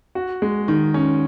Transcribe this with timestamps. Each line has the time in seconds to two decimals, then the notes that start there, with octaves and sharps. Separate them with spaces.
0.15 F#4
0.42 G#3
0.68 D#3
0.94 C#4